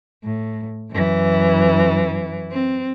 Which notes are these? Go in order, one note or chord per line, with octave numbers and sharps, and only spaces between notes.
A2
F#2 E3
C4